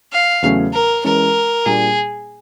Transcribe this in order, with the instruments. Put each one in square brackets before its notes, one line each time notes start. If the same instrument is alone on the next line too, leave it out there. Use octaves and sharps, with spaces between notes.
[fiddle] F5
[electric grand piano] E2 C#3 F#3 A3 C#4
[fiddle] A#4
[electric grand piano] E3 G#3 C#4 [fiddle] A#4
[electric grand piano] A#2 G3 A#3 D4 [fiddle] G#4